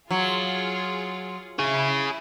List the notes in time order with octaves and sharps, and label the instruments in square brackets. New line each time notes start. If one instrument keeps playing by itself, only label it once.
[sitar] F#3 [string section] F4 G#4
[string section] E4 [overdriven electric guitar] G#4 C#5